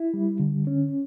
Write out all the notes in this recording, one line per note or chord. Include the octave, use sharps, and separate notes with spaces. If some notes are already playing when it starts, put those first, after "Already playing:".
Already playing: E4
G3
D3
C#4